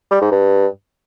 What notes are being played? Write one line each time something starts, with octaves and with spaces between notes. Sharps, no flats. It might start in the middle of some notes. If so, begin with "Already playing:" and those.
G3
G#2
G2